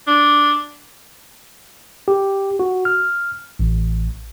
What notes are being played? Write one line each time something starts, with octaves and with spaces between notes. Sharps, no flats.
D4
G4
F#4
F6
A1